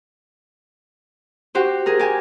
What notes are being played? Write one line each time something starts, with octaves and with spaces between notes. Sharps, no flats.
F#4 G4 C5
G#4 A#4
G4 G#5